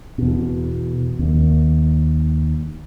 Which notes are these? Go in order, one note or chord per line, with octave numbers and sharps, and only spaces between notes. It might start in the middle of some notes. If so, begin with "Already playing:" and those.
E2 B2
D#2